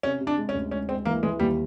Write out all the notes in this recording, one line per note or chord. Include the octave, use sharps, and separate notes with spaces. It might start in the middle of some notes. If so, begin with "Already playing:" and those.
C3 C#4
C3
D4
G#3
C#4
D2
G#3 C#4
G#3 C4
E3 A#3
E3 G#3
D#2 G3